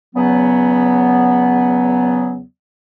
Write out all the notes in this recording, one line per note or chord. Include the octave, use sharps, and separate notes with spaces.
E2 C#3 F#3 B3